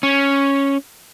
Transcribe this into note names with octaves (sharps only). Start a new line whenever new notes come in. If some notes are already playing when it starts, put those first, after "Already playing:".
C#4